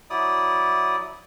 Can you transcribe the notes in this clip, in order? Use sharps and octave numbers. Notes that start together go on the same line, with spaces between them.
F#3 E4 D5 D#6